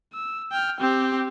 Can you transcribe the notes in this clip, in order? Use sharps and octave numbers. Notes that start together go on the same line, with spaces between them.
E6
G5 F6
C4 G4